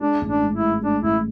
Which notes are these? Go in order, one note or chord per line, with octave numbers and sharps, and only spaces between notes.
G#3 D4
A1
D4
G#2
E4
G#3
G#3 D4
A1 E4